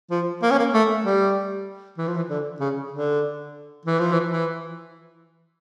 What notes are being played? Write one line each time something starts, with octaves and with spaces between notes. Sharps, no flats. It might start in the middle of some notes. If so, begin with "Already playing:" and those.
F3
A#3
C#4
A#3
A3
G3
E3
F3
E3
D3
C#3
D3
E3
F3
E3
E3